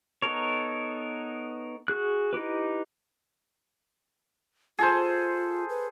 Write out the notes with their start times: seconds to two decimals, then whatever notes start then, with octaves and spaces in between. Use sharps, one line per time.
0.22 B3 D#4 A4 A#4 C#5
1.88 F#4 G#4 F#6
2.33 D#4 E4 G4 B4
4.79 F4 G#4 A4 C5
5.69 B4